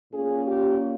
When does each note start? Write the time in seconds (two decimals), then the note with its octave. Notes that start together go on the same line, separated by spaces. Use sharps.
0.12 A#2 A#3 C#4 G#4
0.47 G4